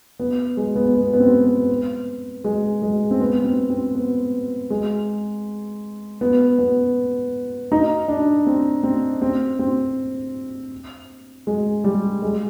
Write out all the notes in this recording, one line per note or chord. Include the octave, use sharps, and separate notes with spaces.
B3
G#3
B3
B3
B3
C4
B3
G#3
G#3
C4
B3
C4
C4
B3
G#3
B3
B3
D#4
D4
C4
C4
C4
C4
G#3
G3
G#3